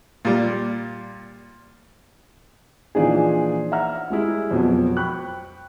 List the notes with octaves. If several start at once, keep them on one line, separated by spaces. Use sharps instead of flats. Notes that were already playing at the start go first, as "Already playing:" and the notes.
A#2 G3
A#2 E3 F3 D4 D#4 G#4
E5 F#5 A#5 F6
G3 G#3 E4
F2 B2 F#3
G5 B5 C#6 F#6